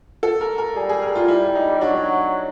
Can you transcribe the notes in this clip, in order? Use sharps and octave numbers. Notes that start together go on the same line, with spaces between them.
A4
A#4
A#4
G3 G#4
G#4
A#4
F4
G3 E4
D#4
F#3 D4